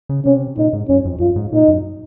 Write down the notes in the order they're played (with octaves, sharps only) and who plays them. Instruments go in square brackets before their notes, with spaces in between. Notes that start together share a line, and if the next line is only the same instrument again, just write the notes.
[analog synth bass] C#3
[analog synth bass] C3 [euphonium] C#4
[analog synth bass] A#2 [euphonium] D#4
[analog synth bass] G#2
[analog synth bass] F#2 [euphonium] C#4
[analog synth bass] F2
[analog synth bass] F#2 [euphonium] F4
[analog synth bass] G#2
[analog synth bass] A#2 [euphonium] D#4
[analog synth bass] F#2